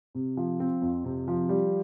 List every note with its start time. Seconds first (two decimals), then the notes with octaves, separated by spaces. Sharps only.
0.15 C3
0.37 F3
0.60 C4
0.82 F2
1.04 C3
1.28 F3
1.49 G3